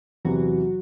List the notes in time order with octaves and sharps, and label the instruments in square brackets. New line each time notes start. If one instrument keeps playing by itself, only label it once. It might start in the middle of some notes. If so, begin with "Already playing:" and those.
[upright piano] E2 C3 E3 [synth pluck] F#3 F#4